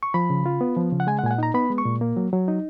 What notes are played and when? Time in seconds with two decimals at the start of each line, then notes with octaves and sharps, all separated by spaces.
0.03 C#6
0.14 F3 B5
0.30 C#3
0.46 F4
0.61 B3
0.77 F3
0.92 C#3
1.00 F#5
1.07 G#3 G#5
1.19 F#5
1.23 A#2 G#5
1.31 F#5
1.38 D#4 A#5
1.54 B3 B5
1.70 G#3
1.78 C#6
1.85 A#2
2.01 A#3
2.17 F#3
2.33 F#3
2.48 D#4